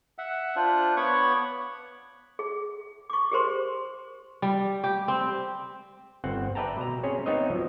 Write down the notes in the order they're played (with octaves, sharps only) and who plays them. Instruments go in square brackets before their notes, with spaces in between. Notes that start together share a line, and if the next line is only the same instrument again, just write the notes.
[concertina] E5 F#5
D4 F4 C5 F#6
B3 C#5 F#5 B5 C#6 D6
[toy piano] G#4
C#6 D6
G4 G#4 A#4 C5 C6
[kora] G3
G4
C4
[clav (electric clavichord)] G1 C4 F#5
B4 D5 E5 G5 A5 A#5
B2 A#5
C4 C#4 G#4 C5 C#5
B3 C4 D#4 C#5 D#5 E5
F3 F#3